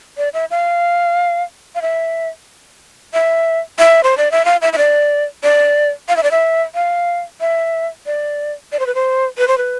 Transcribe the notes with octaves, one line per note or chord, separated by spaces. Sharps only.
D5
E5
F5
F5
E5
E5
E5
C5
D5
E5
F5
E5
E5
D5
D5
F5
E5
D5
E5
F5
E5
D5
D5
C5
B4
C5
B4
C5
B4